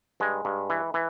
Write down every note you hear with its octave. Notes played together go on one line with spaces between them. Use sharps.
G2 G#3
G2
E3
E3